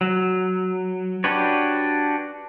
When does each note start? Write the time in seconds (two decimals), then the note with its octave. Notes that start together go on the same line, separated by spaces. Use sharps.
0.01 F#3
1.24 D4 F#4 G4 B4 C#5